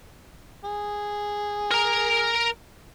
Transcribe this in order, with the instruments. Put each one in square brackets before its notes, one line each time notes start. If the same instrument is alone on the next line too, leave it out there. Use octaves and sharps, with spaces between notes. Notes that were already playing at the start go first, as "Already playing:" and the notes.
[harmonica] G#4
[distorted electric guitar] A#4 A#5